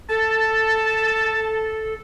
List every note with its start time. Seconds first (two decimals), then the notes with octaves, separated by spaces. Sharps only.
0.10 A4 A5